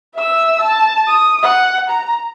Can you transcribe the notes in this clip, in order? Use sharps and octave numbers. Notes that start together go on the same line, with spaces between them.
E5 E6
A5
D#6
F#5
A#5